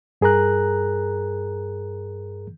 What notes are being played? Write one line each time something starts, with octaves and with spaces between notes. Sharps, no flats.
G2 G#4 A#4 A#5 F#6